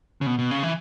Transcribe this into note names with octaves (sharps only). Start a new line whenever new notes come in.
C#3
B2
B2
C#3
E3